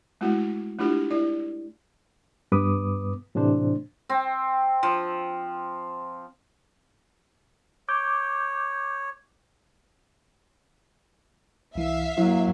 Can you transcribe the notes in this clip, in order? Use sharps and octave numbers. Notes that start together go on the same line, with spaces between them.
G#3 A3 B3 E4 F#4
A3 D4 E4 F4 G4
E4 D5
G2 B3 B4 D6 D#6
A2 C3 E3 D4 C5
C4
F3
C#5 D6 G6
C2 E3 E5 F5
F#3 A#3 E4